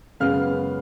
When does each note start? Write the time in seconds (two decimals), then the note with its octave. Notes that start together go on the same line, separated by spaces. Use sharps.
0.20 F#2 C#3 G#3 B3 F5 F6